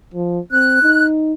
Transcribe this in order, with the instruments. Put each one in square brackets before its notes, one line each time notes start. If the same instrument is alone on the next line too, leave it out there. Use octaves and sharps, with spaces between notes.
[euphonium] F3
[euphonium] C4 [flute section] F#6
[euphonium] D#4